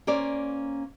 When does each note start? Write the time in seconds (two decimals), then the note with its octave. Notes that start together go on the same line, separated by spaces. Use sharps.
0.07 A#3 C#4 C5 D5